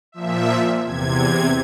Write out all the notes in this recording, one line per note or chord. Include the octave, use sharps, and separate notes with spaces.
A#2 F3 E5
E2 C3 G#6